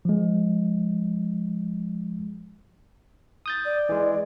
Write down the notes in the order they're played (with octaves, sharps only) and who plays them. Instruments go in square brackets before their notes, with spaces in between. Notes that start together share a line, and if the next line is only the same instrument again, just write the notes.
[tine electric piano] F3 G#3
D#6 G6 A6
[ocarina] D5
[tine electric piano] E3 G#3